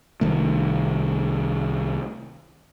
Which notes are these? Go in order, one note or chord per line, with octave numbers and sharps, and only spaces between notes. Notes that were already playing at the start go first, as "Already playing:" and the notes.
C2 D#3 A3